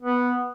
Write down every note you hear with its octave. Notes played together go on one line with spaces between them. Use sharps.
B3